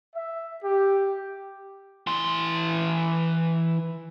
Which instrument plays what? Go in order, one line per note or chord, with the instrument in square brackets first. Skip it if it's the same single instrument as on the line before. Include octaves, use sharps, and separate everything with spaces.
[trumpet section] E5
G4
[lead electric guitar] E3 C6